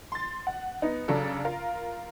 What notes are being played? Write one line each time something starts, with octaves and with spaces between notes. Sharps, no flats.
C6 A6
F#5
B3 D#4
C#3 F#3 D4 A4
F4 A#4 F5